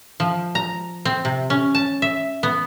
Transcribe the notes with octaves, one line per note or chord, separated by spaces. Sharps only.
F3
A#5
C4
C3
C#4
A5
E5
B3